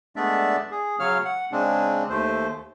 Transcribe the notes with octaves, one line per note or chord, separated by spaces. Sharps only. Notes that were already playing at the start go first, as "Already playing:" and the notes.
G#3 A3 B3 D4 D5 E5
G#4
C#3 F#3 C#5 F5 F6
F#5
C#3 G#3 C4 D4
D#2 A3 C5